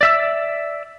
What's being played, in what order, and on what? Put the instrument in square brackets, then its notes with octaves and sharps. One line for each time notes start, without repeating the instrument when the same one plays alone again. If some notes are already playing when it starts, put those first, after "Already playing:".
[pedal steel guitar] D5 E5 E6